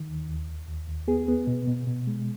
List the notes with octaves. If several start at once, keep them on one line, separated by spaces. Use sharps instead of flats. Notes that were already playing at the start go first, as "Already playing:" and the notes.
Already playing: D#3
D#2
D#2
D#2
D#2
D#2
B3 G#4
B3
B2
B2
B2
G#3